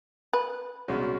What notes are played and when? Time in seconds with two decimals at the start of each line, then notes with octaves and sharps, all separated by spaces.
0.33 B4
0.88 C2 B2 G#3 C#4 F#4